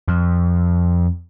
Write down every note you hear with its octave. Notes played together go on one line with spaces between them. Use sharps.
F2